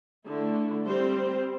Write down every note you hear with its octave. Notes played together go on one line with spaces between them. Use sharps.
D3 A3 E4
G3 C4 G4 C5